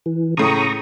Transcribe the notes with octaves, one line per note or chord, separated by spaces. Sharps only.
E3
A2 C#3 A#5 C#6 D#6